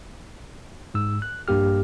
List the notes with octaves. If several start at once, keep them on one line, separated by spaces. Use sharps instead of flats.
G#2 E6
F#6
A#1 G2 A#3 G4 F6